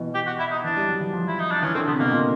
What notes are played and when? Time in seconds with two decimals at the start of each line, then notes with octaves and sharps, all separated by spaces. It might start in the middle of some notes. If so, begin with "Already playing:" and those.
Already playing: B2 E3
0.14 G4
0.26 F#4
0.39 E4
0.51 D#4
0.64 E3 D4
0.76 G3
0.88 F#3
1.00 E3
1.13 F3
1.28 E4
1.39 D#4
1.51 D4
1.62 E3 C#4
1.75 D3 C4
1.87 C3 B3
1.99 B2 A#3
2.12 A#2